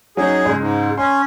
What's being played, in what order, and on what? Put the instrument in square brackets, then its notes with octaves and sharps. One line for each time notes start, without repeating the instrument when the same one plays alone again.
[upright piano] F#3 C#4 D#4 [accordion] G#4
[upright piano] C#2 G#3
[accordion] G#2
[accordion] C#4 [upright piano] C6